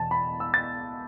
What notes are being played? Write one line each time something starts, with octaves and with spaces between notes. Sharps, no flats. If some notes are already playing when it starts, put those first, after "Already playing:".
Already playing: E2 B2 A5
B5
E6
A6